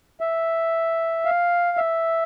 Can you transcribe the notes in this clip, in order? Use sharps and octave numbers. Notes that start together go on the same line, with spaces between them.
E5
F5
E5